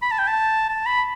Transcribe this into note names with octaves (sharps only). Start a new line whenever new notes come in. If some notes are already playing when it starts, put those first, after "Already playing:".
B5
A5
G5
A5
A5
B5